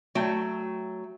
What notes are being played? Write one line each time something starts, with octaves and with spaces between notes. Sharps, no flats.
F#3 A3 G5